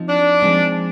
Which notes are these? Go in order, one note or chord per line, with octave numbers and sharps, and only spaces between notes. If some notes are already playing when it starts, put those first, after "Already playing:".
Already playing: F3 C4 D#4
D4
F3 G#3 C4 D#4